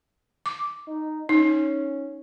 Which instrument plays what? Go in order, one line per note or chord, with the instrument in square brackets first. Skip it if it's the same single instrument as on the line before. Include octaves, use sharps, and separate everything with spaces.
[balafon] D6
[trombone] D#4
[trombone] C#4 [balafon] D#4